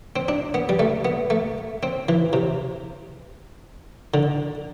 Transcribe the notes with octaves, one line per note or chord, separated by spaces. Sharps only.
C4
D4
B3
G3
A3
B3
A3
C4
E3
C3
D3